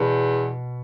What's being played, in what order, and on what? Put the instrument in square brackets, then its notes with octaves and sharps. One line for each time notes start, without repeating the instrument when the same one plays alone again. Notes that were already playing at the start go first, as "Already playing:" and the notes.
Already playing: [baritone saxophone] E2 [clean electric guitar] B2